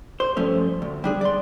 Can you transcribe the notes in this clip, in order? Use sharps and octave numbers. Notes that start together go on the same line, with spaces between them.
C5
G2 F3 A3 C#4
D2
G3 D4 G#4
D5 C6